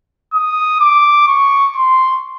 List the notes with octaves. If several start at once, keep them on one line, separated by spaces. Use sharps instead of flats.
D#6
D6
C#6
C6